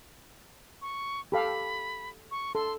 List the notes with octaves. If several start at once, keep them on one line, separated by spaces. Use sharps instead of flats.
C#6
G4 A4 F5 B5
C#6
A4 C6